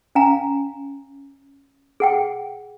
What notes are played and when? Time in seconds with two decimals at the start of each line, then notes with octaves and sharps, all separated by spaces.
0.15 C#4 F5 G#5 A#5
2.00 G#4 F#5 G5